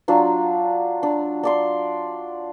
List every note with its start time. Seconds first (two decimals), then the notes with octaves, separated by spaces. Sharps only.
0.08 F#3 D4 F4
1.03 D4
1.43 D4 D5 C6